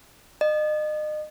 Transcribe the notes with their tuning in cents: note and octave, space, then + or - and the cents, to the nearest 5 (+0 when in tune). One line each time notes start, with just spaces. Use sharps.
D#5 -35